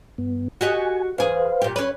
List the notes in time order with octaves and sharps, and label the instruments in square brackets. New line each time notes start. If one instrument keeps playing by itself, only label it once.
[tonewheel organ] G2 B3
[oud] F#4 G4 D#5 [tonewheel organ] G#5
[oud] E2 G#4 [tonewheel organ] B4 C5 F5
[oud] A#2 G4
[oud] C#4 B4 [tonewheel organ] C#5